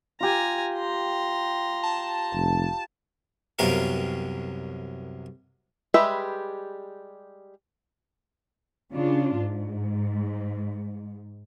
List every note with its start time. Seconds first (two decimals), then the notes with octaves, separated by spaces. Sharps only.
0.21 F4 G4 G#5 A#5
0.75 A#5 C6
1.83 A5
2.33 F1
3.59 C2 F#2 C3 B3 A#4 F5
5.94 G3 G#3 G4 B4 E5
8.93 C#3 D4 F4
9.38 G#2